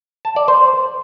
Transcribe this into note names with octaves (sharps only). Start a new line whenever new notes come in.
A5
D5
C5